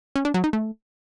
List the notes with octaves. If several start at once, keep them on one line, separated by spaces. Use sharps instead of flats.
C#4
D4
F#3
D#4
A3